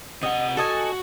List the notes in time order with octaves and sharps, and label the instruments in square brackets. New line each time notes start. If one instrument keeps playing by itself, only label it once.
[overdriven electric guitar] C3 F#5 [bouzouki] D#5
[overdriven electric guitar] F#4 [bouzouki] A4 D#5 G#5